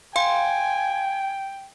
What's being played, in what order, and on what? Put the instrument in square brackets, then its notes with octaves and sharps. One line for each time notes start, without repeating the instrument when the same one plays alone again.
[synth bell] F5 C6 [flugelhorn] G5 [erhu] G#5